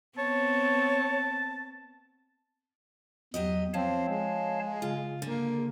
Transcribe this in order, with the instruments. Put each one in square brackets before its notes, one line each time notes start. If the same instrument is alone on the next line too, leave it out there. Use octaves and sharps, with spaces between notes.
[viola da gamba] B3 C4 [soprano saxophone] C#5 [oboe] A5
[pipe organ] E2 [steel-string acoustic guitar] F#3 G4 D#5
[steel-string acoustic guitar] F3 [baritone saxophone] C4 [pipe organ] C#5 F5 A5
[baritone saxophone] G#3
[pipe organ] C#3 [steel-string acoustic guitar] F4
[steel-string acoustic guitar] D3 [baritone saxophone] A#3